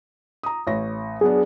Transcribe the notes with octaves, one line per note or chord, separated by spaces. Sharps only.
A#5 D#6
A1 C#5 A#6
F#3 B3 D4 G#4